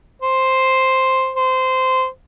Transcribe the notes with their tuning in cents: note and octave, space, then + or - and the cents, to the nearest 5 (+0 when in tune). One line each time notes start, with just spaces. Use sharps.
C5 +0
C5 -15